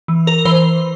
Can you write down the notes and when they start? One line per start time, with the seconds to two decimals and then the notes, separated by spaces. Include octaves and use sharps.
0.08 E3
0.27 A#4
0.45 E3 C5